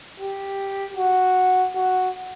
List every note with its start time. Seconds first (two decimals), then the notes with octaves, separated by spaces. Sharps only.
0.20 G4
0.97 F#4
1.75 F#4